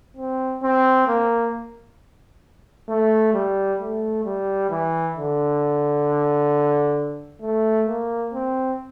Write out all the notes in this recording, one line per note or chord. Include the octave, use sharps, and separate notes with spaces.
C4
C4
A#3
A3
G3
A3
G3
E3
D3
A3
A#3
C4